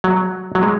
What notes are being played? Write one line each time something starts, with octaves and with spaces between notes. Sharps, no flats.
F#3
F#3
G#3